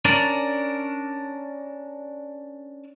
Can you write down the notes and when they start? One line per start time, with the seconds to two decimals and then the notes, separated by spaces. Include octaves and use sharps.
0.05 C#4 D4 A#4 D5 A5